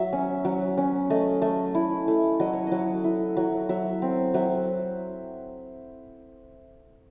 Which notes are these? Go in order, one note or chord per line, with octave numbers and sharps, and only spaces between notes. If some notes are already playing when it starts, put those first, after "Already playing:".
Already playing: F#3 E5
C#4
F#3
C#4
A3 D#5
A3
E4
A3
F#3 D#5
C#5
F#3 D#5
E4
F#3
F#3 E5
C4
F#3 E5